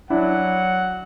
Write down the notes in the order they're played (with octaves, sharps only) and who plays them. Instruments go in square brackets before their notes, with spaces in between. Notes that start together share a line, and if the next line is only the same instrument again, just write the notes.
[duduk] F#3 [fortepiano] D4 E4 [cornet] F#5